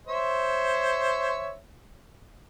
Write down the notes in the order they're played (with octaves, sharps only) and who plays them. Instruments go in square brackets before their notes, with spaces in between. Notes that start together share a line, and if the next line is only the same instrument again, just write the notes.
[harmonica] C5 C#5 E5